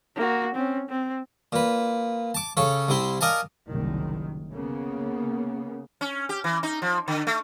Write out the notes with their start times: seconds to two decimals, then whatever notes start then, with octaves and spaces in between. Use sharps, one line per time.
0.16 A#3 F#4
0.55 C4 C#4
0.89 C4
1.52 A#2 B4
2.34 A5 D6
2.57 C#3 A4 C#5
2.88 C2 C3 E4 C6
3.21 A#4 D5 D#5 F5 G#5 A5
3.68 F#1 C2 D#3
4.52 C#3 A#3 B3
6.01 C#4
6.29 G4
6.44 E3
6.63 D#4
6.82 F3
7.08 D3
7.27 A3